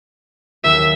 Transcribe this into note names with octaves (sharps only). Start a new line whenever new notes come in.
D#2 D#3 F#3 E5